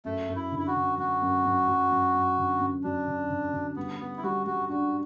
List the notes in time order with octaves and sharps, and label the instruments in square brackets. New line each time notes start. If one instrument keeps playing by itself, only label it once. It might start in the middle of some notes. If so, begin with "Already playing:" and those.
[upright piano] F#2 [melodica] A3
[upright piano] F#2
[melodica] E4
[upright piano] D3
[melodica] E4
F#4
[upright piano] D3
[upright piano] F#3 [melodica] F#4
[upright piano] F#2
F#2
F#3
F#2
F#2
D3
F#2
[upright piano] F#3 [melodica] D4
[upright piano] D3
D3
D3
[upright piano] G3 [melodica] B3
[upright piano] G3 [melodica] B3
[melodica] E4
[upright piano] G3 [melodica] F#4
[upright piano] G3 [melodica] F#4
[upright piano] D4 [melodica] F#4